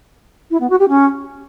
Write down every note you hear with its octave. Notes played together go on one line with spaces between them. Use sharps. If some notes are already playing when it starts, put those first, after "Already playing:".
E4
B3
F#4
G4
C#4